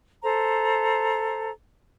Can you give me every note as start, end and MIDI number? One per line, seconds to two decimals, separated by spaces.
0.22 1.50 69
0.22 1.50 72
0.22 1.50 82